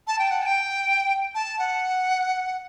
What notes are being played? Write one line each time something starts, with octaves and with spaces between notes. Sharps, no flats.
A5
G5
F#5
A5
G5
A5
F#5